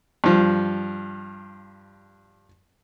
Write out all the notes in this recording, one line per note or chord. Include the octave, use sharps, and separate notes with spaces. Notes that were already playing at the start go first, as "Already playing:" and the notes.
G2 F3